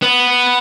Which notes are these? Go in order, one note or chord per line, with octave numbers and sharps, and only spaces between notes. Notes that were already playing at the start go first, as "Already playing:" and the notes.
B3